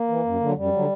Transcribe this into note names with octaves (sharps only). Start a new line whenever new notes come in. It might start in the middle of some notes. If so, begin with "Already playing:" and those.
Already playing: A#3
E3
F#2
D3 F#3
F#2 G3
D3 F#3